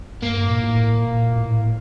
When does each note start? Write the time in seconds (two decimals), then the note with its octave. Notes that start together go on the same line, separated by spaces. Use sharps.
0.22 G2 A#3
0.48 A#2
0.60 A2
0.98 A#2
1.36 A2